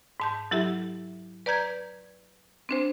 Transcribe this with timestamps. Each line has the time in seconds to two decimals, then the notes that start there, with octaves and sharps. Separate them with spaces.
0.20 G#2 A5 G6
0.51 F#3 E4 G4 A4 E5
1.46 B4 D5 A#5 G6 G#6
2.69 C4 D4 C5